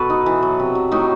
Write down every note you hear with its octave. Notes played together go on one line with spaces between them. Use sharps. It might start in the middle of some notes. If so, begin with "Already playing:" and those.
Already playing: B2 F#4 A4 B4
D#4
E3
F#3
C3
F#3
A2 D#4 F#4